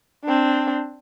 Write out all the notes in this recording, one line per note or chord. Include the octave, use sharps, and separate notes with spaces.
C4 D4